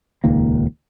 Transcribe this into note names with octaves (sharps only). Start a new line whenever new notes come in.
D#1 C#2 D#3 A#3